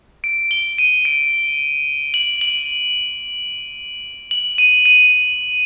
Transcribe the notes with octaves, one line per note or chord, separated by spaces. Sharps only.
D7
G7
D#7
D7
F#7
F#7
F#7
D#7
D#7